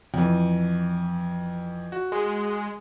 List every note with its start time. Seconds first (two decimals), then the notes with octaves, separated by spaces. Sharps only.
0.14 F2 E3
1.92 F#4
2.12 G#3